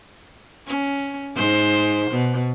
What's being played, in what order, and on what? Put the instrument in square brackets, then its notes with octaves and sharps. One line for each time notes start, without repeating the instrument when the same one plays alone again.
[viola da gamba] C#4
G#2 C5
B2